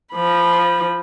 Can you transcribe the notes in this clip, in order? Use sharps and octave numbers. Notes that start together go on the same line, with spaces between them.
F3 B5